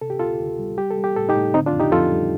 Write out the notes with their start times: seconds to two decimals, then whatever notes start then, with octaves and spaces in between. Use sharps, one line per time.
0.01 C3 A4
0.10 G4
0.19 D2 F4 A4
0.40 D2
0.59 G3
0.78 G3 G4
0.91 A4
0.98 G3
1.04 G4
1.16 A2 A4
1.29 D#4 G4
1.35 A2
1.54 D3 C4 D#4
1.66 D4 F4
1.73 F2
1.80 D#4 G4
1.92 F2 F4 A4
2.12 G3